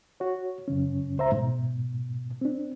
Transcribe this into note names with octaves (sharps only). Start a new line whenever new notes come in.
F#4 C#5
F#2 C#3 C#4
C#2 C5 E5 A#5
G#2 B2
C4 D4